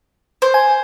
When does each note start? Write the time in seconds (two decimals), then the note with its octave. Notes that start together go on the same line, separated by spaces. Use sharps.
0.42 C5
0.54 G#5